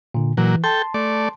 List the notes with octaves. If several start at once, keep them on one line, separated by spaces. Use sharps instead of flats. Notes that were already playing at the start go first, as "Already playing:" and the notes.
A#2 D3
A#2 E3 F#3
A4 G5 A5 C6
A3 D5